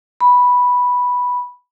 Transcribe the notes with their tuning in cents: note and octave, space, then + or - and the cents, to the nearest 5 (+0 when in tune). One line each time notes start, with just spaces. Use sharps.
B5 -5